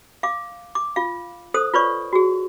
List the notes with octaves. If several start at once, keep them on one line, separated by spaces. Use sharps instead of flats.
F5 D6
D6
F4 F5
A4 C5 D#6
F4 B4 C#5 D5 C#6
F#4 G#4